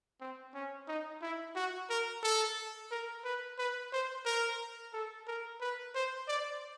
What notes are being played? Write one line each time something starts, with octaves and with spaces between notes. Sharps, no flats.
C4
C#4
D#4
E4
F#4
A#4
A4
A#4
B4
B4
C5
A#4
A4
A#4
B4
C5
D5